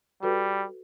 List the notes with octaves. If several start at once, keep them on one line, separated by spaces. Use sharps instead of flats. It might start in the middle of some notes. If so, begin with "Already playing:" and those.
G3 F#4 A4 B4